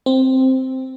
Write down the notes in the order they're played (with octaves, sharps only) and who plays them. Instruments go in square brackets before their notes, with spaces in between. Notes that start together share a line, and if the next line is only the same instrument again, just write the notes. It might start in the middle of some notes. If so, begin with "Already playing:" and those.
[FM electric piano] C4